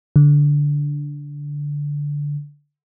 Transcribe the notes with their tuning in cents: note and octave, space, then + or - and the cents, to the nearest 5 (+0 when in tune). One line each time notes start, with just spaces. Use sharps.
D3 -10